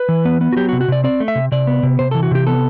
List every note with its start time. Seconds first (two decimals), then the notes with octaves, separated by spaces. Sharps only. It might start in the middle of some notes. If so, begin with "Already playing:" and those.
Already playing: B4
0.09 E3
0.25 B3
0.41 B3
0.53 F#4
0.57 F#3 G4
0.69 F#4
0.73 C3
0.81 F#4
0.88 C3 D5
1.04 C4 D5
1.20 A3
1.28 E5
1.35 C3
1.52 C3 D5
1.67 B3
1.83 C3
1.99 C3 C5
2.11 E3 A4
2.23 F#4
2.31 C3 G4
2.47 B3 A4